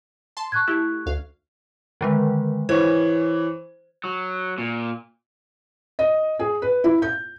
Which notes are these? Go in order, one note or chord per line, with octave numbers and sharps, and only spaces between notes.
A5 C6
C#6 F#6 G#6
A3 E4 G4
D2 F5
D3 D#3 G#3
E3 C5 C#5
F#3
A#2
D#5
G#4
B4
E4
G6